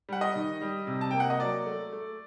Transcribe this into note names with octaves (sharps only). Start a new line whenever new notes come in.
G3 F#5
D#5
D#3
G3
C3
A5
A#3 G5
F#5
D#5
F#3 D5
A3
A3